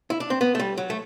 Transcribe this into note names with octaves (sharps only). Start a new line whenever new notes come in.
E4
D4
C4
B3
A3
G3
F#3
A3